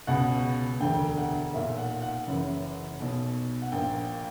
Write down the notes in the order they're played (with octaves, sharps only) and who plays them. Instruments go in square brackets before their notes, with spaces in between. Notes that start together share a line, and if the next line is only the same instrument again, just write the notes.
[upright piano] C#2 B2 F#5
E1 D2 D3 G5
F#5
B1 A#2 E5
F#5
F#5
F#1 F#2 E3
B1 B2
F#5
A#1 A#2 G5